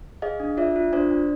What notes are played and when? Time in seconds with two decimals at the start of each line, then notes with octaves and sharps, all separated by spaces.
0.22 G#4 D#5 F5
0.40 D4
0.57 F4 D5 E5
0.76 F4
0.93 D4 C5 D5
1.11 D4